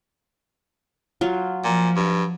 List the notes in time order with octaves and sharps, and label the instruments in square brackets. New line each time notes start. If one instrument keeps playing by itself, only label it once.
[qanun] F#3 F4
[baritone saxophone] A#2 [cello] F3
[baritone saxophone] G2